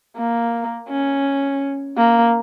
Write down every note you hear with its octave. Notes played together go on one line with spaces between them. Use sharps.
A#3
C#4
A#3